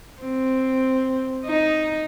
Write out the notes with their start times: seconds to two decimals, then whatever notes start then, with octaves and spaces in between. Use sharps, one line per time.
0.22 C4
1.46 D#4